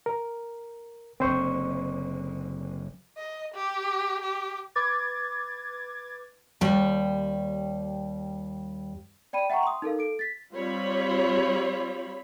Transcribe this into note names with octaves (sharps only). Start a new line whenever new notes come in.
A#4
F#1 D3 C4 C5 C#6
D#5
G4
G4
B4 D6 G#6 A6
D#2 G3
D5 G5 B5 D#7
E5 F#5 G5 A#5 C#6
C6 D#6
D#4 A4 A#4 F5
A4 D7
A6 B6
G3 C4 F4 C#5 B5